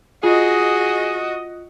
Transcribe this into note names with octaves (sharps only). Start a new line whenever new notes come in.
F4 F#4 G#4 D#5